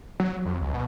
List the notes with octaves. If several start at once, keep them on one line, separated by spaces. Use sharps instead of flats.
F#3
F2
C#2
B2